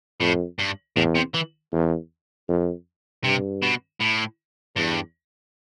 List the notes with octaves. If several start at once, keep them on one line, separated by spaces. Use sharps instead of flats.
F2 A2
G2
E2 A2
C3
E3
E2
F2
G2 C3
B2
A2
E2 G2